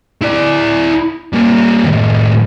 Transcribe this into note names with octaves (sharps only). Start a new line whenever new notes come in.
E4 D5
G3 A#3
A2 D#3